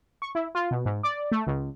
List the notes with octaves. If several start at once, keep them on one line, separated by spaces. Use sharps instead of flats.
C#6
E4
F4
B2
G#2
D5
A3
C#2